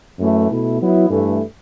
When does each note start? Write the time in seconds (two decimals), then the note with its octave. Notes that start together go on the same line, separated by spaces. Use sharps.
0.18 F#2 E3 A3
0.48 B2 A3 E4
0.79 F#3 B3 E4
1.09 G2 E3 A3